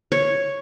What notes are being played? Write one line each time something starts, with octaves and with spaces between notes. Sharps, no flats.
C#5